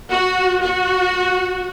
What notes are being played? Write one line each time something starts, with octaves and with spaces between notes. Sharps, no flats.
F#4
F#4